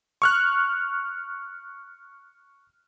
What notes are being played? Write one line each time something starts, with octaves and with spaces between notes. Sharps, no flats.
C#6 F6 F#6